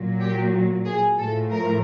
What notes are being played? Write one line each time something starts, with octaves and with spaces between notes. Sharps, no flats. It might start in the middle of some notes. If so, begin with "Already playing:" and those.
Already playing: A#2 F#3
G4
G#4
A2 F3 A4
A#4